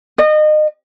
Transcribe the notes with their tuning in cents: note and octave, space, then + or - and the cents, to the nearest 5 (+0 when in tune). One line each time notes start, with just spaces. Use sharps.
D#5 -30